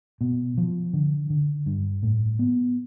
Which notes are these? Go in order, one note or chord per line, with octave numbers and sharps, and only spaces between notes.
B2
F3
D3
D3
G2
A2
B3